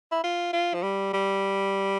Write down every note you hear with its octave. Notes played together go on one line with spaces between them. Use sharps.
E4
F4
F4
F3
G3
G3